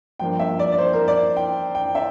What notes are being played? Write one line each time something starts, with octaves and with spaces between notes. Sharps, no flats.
G2 F3 A#3 D4 G5
E5
D5
D5
C5
A#4
D5
G5
G5
E5